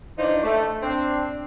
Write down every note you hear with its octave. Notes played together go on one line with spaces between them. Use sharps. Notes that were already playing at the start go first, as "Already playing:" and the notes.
E3 F3 D4 D#4 C5
A3
C4 D4